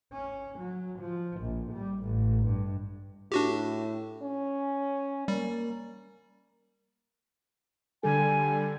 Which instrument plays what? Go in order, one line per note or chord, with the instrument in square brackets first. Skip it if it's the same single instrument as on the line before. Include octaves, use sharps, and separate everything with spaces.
[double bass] C#4
F#3
F3
A#1
G3
A1
G2
[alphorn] A2 [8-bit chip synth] D4 F#4 G4
[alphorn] C#4
[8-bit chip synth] G3 [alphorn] A#3
[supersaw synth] D3 G3 [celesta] A4 [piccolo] G#5